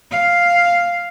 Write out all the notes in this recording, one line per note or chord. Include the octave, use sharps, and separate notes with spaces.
F5